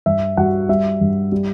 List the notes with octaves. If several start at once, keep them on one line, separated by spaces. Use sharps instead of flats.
G2 E5
G2 F#4 F#5
G3 E5
G2
G3